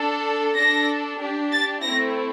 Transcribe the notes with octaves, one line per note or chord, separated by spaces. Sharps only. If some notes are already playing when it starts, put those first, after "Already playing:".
Already playing: D4 A4
D4 A4 A#6
D4 G4
A6
A3 C4 E4 A#6